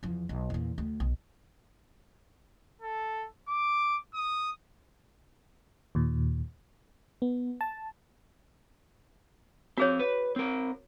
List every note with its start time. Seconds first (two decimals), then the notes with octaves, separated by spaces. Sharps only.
0.03 E2 F3
0.29 B1
0.50 E2 A#2
0.78 D2
1.00 B1
2.82 A4
3.48 D6
4.14 D#6
5.95 D#2 A#2
7.22 B3
7.61 A5
9.78 C4 F#4 G#4 C#5 F5
9.99 B4
10.36 C4 A#4